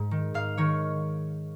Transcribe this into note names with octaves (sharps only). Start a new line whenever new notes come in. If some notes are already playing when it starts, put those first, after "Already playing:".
Already playing: G#2
D#3
G#2 F5
D#3 C#5